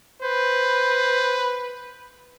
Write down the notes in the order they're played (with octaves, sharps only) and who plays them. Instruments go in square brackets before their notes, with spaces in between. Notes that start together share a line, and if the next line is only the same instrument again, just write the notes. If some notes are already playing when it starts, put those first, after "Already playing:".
[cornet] B4 [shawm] C5